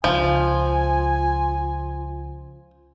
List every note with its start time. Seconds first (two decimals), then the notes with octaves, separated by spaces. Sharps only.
0.04 C#2 F3 F4 G#5